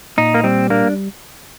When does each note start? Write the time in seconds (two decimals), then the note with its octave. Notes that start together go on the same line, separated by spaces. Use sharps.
0.17 A#2 D#4
0.34 A#3
0.43 G3 C4
0.70 A#3 D4